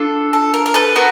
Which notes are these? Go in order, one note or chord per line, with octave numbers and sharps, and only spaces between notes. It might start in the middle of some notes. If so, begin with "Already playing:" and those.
Already playing: D4 F4 A4
A4
A#4
A#4
A4 B4
B3 F#4 A#4